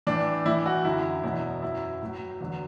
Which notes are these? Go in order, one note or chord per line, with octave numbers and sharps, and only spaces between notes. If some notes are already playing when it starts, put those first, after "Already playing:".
A2 E3 D4
A2 E3 E4
F#4
F#2 D3 F#3 E4
E2 B2 F#3 E4
F#2 F#3 E4
A2 F#3
E2 D3 F#3